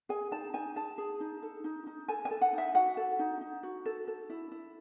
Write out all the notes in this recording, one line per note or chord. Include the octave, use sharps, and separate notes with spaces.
G#4 G#5
D#4 A5
D#4 G#5
G#4 A5
G#4
D#4
A4
D#4
D#4
A4 G#5
G#5
A4
F#5
D#4
E5
F#4 F#5
A4
D#4
D#4
F#4
A4
A4
E4
E4